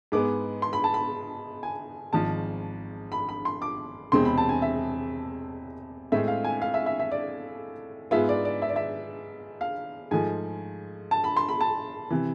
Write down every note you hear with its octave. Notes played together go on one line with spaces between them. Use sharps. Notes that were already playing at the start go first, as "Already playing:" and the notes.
G#2 G#3 B3 D6
C6
B5
A5
B5
G#5
G#1 G#2 F3 A5
B5
B5
C6
D6
E1 E2 C3 G#3 C4 C6
B5
A5
G#5
E5
A2 G#3 C4 E5
F5
G#5
F5
E5
E5
E5
D5
G#2 G#3 B3 F4 E5
D5
D5
E5
D5
E5
F5
G#2 F3 A3 G#5
A5
B5
C6
B5
A5
C3 E3